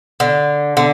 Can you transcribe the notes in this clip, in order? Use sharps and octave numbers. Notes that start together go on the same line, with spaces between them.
D3
D3